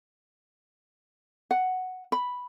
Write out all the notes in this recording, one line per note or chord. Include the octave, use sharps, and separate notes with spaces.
F#5
B5